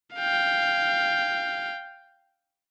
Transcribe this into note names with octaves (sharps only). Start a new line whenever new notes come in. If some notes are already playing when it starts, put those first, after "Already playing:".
F5 G5